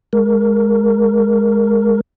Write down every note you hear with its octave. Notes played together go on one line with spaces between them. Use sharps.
G#3 A#4